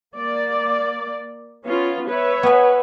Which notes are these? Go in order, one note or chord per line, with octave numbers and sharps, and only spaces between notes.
A#3 D5
B3 C#4 F4
B4 C#5 E5
B3 G#5